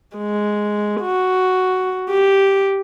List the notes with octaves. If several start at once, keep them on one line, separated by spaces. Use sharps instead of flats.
G#3
F#4
G4